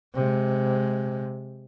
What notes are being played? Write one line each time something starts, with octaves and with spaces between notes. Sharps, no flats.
C3 G#3